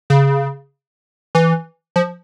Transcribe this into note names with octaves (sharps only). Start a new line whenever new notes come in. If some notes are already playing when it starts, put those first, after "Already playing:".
C#3
E3
F3